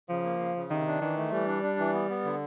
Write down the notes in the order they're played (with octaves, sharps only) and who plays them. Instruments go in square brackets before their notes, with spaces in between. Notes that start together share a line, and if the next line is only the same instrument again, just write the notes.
[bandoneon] C#3 [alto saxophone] F3
[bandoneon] A#3
C#3
C#3
[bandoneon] C3 [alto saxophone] D#3
[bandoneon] D4
[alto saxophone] D#3 [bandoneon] E3
[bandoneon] A3
[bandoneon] E3 [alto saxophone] G3
[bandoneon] D4
D4
E3
B3
B3
D3